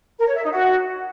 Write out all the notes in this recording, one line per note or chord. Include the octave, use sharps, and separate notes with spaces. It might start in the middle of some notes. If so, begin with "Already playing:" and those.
A#4
C#5
E5
D#4
F#4